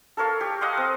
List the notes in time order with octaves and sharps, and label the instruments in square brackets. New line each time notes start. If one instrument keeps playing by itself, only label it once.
[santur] A4 A#4 C#5 F5
G4
D#5 F5 F#5 C6
C4